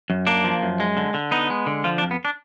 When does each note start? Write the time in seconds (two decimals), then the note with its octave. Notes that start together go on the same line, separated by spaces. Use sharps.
0.10 F#2
0.27 A#3 D4
0.44 F3
0.63 F#2
0.80 G#3
0.97 D3
1.14 D3
1.31 B3 D#4
1.50 G#3
1.67 D3
1.84 F3 F4
1.98 D4
2.02 F2
2.11 B3
2.25 D4